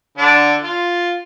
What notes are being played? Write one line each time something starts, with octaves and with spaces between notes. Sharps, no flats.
D3 D4
F4